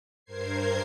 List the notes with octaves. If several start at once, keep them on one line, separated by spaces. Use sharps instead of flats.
G2 A#4 C5 G#6 C7